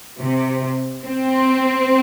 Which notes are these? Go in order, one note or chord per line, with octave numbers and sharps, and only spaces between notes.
C3
C4